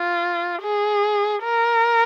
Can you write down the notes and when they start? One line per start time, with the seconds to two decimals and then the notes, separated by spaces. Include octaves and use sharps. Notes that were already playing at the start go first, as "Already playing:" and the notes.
Already playing: F4
0.63 G#4
1.44 A#4